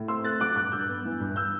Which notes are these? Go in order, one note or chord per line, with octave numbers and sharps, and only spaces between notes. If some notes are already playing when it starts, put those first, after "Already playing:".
Already playing: A2
C4 C6 E6
A3 F#6 A6
F#3 D6 F#6
G2 D6 F#6
G2 E6 G6
B3
E3
G2
E6 G6